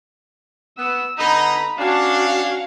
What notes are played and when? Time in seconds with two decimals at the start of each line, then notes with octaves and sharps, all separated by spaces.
0.78 B3 E6
1.18 D3 B3 D#4 A#5 B5
1.78 C#4 D4 F#4 F5